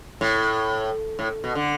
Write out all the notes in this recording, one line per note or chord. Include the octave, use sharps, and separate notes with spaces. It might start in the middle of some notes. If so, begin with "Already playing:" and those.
A2
A2
B2
D3